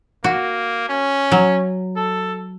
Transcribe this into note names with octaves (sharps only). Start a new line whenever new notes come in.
A#3 F#4
C#4
F#3
A4